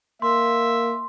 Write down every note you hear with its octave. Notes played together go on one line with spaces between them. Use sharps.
A#3 E5 C6